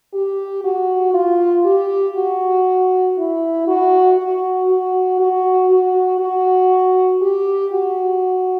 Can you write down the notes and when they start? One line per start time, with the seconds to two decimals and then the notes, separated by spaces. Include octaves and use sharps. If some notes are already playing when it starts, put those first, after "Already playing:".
0.14 G4
0.64 F#4
1.14 F4
1.65 G4
2.16 F#4
3.18 E4
3.67 F#4
4.18 F#4
4.69 F#4
5.20 F#4
5.71 F#4
6.20 F#4
7.22 G4
7.73 F#4